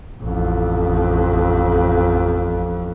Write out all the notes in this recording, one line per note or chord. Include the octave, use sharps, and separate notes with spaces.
A1 F2